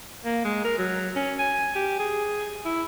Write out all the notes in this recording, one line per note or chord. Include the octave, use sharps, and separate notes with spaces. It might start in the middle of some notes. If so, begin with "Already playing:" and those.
A#3
G#3
A#4
F#3
C#4
G#5
G4
G#4
E4